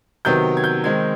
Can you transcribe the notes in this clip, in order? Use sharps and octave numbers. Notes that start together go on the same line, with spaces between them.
C3 D#3 F#3 B3 G6
G#6
G6
D#3 G#3 C4 G#6